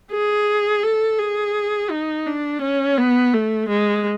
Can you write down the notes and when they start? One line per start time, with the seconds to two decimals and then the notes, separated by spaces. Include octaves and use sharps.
0.12 G#4
0.83 A4
1.19 G#4
1.90 D#4
2.26 D4
2.61 C#4
2.97 B3
3.33 A3
3.69 G#3